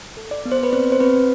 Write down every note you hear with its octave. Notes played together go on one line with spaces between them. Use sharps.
A4
D5
B3
C5
B4
C4 C5
C5
C4 B4